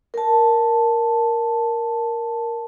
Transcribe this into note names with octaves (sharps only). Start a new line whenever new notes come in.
A#4 A5